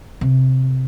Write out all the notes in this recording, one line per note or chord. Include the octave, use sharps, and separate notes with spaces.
C3